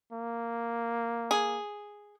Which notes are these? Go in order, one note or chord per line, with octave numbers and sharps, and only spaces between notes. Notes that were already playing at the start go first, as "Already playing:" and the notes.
A#3
G#4